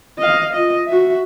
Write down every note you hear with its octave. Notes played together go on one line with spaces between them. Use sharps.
D#5 F5
F4 D#5
F#4 E5